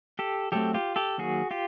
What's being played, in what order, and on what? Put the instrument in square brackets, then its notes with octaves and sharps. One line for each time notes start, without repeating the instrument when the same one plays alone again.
[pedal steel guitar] G4 A4
F#3 A3 C4 G4 A4
F4 G4
G4 A4
D#3 F#3 A#3 F#4 G#4
F4 G4